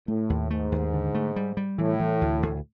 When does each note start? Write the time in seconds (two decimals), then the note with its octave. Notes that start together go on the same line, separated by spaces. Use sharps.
0.08 A2 A3
0.30 D#2
0.50 G#2 A3
0.72 D#2
0.94 D3
1.15 A3
1.36 G3
1.57 G3
1.78 A2 E3
2.00 E3
2.21 D2
2.43 D2